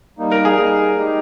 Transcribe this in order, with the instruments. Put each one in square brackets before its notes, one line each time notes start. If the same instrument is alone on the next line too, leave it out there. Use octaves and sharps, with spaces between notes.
[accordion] G3 A#3 D#4
[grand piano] A#4
G#4
[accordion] G3 A#3 D#4
G#3 D#4 G4